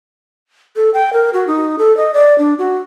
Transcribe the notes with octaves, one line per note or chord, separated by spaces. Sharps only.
A4
G5
A#4
F#4
D#4
A4
D#5
D5
D4
F#4